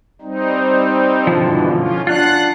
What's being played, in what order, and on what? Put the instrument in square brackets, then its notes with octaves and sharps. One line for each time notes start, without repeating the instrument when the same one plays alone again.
[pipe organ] G3 C4 D#4
[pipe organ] G2 B2 E3 [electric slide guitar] D3 F3
[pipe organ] C#4 F4
[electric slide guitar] D4 F4 [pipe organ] F#5 F#6